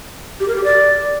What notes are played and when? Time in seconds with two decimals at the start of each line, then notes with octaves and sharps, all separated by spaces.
0.40 G4
0.48 A#4
0.56 G4
0.64 D5